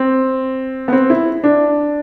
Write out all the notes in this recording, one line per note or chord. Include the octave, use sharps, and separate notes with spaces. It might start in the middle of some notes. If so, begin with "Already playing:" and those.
Already playing: C4
B3
C4
E4
D4